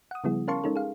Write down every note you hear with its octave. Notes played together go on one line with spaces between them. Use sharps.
F#5 D#6
C#3 F3 G3 B3 E4 G#4
C#4 A#4 F5 A5 C6 C#6
G#3 C#4 D#4 A4 A#4
G#4 F5